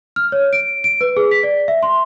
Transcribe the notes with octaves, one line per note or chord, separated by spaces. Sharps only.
F6
C#5
D7
D7
B4
G#4
B6
D5
E5
C6